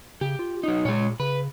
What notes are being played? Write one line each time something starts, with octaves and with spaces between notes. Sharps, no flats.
C#3 G4
F4
F#3 D#4
A#2 G#3 C#5
C#3 B4